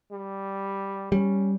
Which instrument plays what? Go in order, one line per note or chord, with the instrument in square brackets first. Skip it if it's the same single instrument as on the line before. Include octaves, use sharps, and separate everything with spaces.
[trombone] G3
[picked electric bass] G3 [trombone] C#4